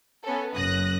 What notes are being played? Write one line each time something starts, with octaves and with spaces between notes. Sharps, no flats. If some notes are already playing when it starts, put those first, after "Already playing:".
B3 C#4 A4
F#1 F#2 D#6 F#6 A#6